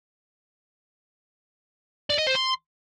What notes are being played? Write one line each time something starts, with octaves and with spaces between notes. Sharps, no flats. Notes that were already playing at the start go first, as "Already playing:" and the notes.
D5
D#5
C5
C6